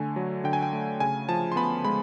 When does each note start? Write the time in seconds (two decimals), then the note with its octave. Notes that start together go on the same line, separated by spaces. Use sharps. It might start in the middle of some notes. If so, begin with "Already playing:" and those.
Already playing: D3 A3 G#5
0.16 F#3
0.44 D3 G5
0.53 G#5
0.62 G5
0.73 A3
1.00 C#3 G#5
1.29 F3 A5
1.52 C6
1.56 B3 B5
1.85 G#3 B5